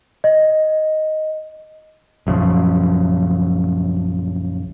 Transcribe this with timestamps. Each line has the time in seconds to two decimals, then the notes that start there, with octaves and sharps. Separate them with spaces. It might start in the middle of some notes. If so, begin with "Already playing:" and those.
0.24 D#5
2.27 A#1 F#2 C#3 F3